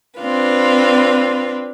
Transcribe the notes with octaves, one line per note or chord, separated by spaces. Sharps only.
C4 D4 F4 B4